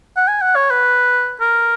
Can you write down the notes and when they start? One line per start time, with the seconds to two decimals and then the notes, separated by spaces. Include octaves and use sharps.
0.16 F#5
0.28 G#5
0.41 F#5
0.56 C#5
0.70 B4
1.41 A#4